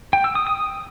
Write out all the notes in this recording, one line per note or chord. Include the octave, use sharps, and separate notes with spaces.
G5
E6
D#6
D#6